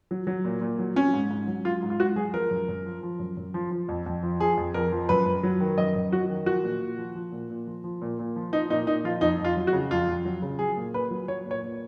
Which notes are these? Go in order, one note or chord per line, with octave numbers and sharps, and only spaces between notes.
F#3
F#3
A#2
A#2
F#3
F#3 C#4
G#2
G#2
F#3
F#3 F4
G#2
F4
G#2 F#4
F#3 G#4
F3 A#4
F#2
F#2
F3
F3
F#2
F#2
F3
F3
F2
F2
F3
F3 G#4
F2
F2 A#4
F3
F#2 B4
F#2
F#3
D#3
F#2 D#5
F#2
F#3 F#4
D#3
F3 F#4
A#2
A#2
F3
F3
A#2
A#2
F3
F3
A#2
A#2
F3
F3 D#4
A#2 D#4
A#2 D#4
F3 F4
F2 D#4
F2
F4
F#3
F#4
C#3
F2 F4
F2
F#3
C#3
F#3 G#4
A#2
A#2 B4
F#3
F#3 C#5
A#2
C#5
A#2